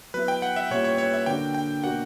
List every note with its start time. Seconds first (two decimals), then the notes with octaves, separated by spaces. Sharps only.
0.14 F#3 B3 E4 B4
0.28 G5
0.42 F#5
0.56 E5
0.71 A#2 G3 C#4 E4 C#5
0.84 C#5
0.98 C#5
1.13 E5
1.26 D3 A#3 D4 F#4 G5
1.54 G5
1.84 B2 A#3 D4 F#4 F#5